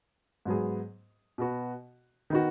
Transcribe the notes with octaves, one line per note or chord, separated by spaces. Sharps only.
G#2 F#3 B3 G#4
B2 B3 F#4
D#3 B3 D#4 F#4